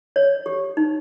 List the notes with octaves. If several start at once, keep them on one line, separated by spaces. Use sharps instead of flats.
C#5
G4
D#4